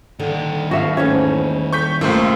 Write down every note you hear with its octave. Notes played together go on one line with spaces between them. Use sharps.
A#2 D3 D#3
B3 D4 F#4 E5 F5
E2 G#2 A3 C#4
C#6 G6 B6
C#2 A3 A#3 F4 C5 E5